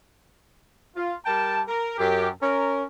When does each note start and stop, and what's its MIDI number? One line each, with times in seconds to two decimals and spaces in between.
0.96 1.15 65
1.25 1.61 55
1.25 1.61 70
1.25 1.61 79
1.25 1.61 81
1.68 1.97 70
1.98 2.28 42
1.98 2.28 67
2.42 2.84 61
2.42 2.84 70